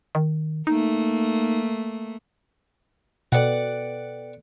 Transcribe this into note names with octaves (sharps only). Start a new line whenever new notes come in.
D#3
A3 A#3 D#4
B2 A4 B4 D5 F#5 G5